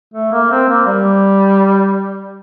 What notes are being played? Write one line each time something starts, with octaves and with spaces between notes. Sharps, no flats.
A3
A#3
C4
A#3
G3